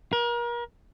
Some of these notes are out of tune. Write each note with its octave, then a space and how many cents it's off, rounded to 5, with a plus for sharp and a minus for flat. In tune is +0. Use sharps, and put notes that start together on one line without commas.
A#4 +35